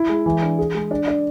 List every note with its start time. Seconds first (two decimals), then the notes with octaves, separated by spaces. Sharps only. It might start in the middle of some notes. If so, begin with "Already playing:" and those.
Already playing: E4
0.09 G#3
0.26 E3
0.42 D4
0.59 G#4
0.75 G#3
0.91 D4
1.08 D4